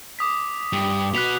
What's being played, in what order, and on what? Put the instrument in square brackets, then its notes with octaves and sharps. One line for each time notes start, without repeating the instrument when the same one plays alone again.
[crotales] D6 D#6 B6
[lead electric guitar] G2
[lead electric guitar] F#4 B4 [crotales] F#6 B6 F7